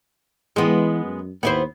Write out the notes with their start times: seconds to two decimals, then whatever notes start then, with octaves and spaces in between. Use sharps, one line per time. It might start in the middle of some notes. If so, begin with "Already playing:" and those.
0.56 E3 G#3 B3
1.04 F#2
1.43 D#2 B3 E4 C5